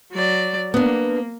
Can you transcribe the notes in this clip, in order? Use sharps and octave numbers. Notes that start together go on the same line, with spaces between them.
F#3 D5
A#3 B3 D4